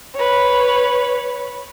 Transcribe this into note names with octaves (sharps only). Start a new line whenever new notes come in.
B4 C#5